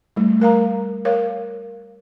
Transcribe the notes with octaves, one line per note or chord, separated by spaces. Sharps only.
G3 A3
A3 A#4 F5 A#5
A#4 C#5 F5